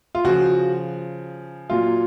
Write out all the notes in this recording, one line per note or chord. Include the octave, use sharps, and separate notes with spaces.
F4
C#3 F3 F#4
A#2 F#3 F4